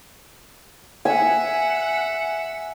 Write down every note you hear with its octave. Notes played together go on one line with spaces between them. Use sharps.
E5 F#5 G#5